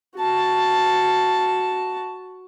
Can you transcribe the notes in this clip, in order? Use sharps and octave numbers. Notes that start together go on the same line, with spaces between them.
F#4 A5